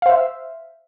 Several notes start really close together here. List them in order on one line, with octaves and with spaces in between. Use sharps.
F5 C5 E5